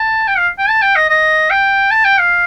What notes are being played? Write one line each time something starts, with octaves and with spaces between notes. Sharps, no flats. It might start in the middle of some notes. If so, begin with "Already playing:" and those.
Already playing: A5
G5
F5
G5
A5
G5
D#5
D#5
G5
A5
G5
F5